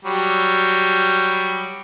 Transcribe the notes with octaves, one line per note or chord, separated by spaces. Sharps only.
F#3 G3